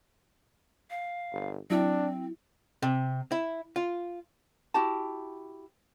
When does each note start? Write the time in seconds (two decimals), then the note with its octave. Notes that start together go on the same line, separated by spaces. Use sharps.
0.90 F5
1.32 G1
1.70 F#3 C4 D4 E4
2.82 C3
3.32 E4
3.76 F4
4.74 E4 F#4 G4 A5